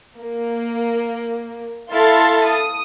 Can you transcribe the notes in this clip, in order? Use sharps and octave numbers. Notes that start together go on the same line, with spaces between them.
A#3
E4 A4 F5 C6 A6
D#6